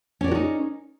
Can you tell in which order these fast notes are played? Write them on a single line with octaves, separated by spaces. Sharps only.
C#4 D5 A#4 F#4 D#4